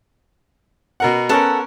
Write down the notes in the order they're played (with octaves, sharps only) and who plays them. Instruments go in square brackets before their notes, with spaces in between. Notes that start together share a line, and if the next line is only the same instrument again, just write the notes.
[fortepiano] B2 A#4 F#5
[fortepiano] B3 C#4 A#4 [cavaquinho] A4 F#5